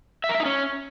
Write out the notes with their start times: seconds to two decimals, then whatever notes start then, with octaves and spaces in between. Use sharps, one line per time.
0.24 E5
0.29 A#4
0.35 E5
0.40 D#4
0.45 C#4